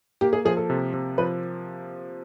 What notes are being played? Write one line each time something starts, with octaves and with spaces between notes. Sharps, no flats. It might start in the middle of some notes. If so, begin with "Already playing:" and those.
A#3 G4
G#4
F3 G#4
A4
C3
C3
F3 B4